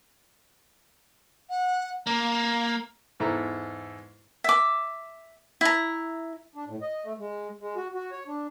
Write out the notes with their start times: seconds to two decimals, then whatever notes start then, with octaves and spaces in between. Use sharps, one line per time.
1.50 F#5
2.07 A#3 A#5
3.20 E2 G#2 E4 A4 A#5
4.44 E5 D6
5.61 E4 A#5
6.55 D4
6.68 A2
6.82 D#5
7.04 A3
7.19 G#3
7.61 G#3
7.76 F#4
7.94 F#4
8.12 C#5
8.27 D4